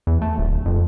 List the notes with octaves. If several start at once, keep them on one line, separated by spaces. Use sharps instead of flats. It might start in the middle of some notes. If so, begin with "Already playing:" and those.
E2
A3
D1
F2